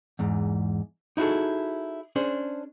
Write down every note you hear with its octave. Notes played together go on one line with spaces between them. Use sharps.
E2 G#2
D#4 E4 F#4 G#4 A4
C#4 D4 G#4 C5